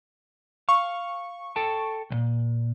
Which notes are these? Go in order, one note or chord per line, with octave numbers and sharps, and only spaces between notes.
F5 C#6
A4 G5 A5
C2 A#2